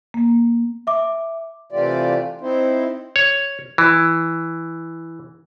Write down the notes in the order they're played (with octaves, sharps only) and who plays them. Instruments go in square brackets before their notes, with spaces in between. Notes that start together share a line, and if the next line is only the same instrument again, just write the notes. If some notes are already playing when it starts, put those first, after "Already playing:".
[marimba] A#3
[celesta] E5 D6
[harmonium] C3 E3 A3 F4 G4 D5
C4 D#4 E4 C5
[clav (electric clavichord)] C#5
E3